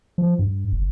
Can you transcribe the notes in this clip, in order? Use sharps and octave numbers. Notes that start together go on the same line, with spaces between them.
F3
G2
F#1